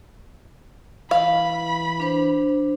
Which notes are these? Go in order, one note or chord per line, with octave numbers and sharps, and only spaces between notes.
E3 F5 B5
D4 C5